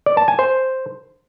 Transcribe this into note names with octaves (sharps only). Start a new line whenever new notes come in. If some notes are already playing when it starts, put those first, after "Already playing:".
D5
A5
G#5
C5